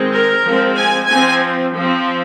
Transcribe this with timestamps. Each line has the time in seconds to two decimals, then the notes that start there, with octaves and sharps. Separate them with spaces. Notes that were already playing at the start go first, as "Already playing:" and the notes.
Already playing: D#3 G#3 C4
0.13 A#4
0.45 F3 G#3 C4
0.77 G#5
1.09 F3 C4 G#5
1.75 F3 C4